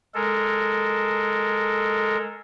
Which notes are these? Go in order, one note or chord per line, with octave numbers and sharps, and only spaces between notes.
G#3 A4 A#4